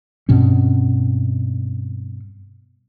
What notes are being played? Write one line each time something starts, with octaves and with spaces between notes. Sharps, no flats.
G2 B2 C4 C#4